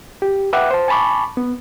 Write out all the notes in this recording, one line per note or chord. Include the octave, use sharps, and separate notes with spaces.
G4
B4 E5 F#5 G5 D6 F#6
C5 A5
G#5 A5 B5 C#6 D6
B3